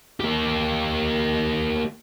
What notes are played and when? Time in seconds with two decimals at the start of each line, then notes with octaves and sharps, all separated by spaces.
0.20 A#3 G4